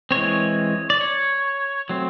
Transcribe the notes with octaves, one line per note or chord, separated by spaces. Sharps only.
E3 G#3 C4 C#5
D5
C#5
F#3 A3 C4